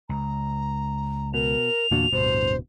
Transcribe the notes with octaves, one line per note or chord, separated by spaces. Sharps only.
C#2 A#5
B2 A#4 F7
E2 A#2 D3 A#3 D4 F#4
D1 G2 B2 C5